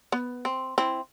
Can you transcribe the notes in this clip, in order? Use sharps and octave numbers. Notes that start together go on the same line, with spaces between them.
B3
C4
C4 E4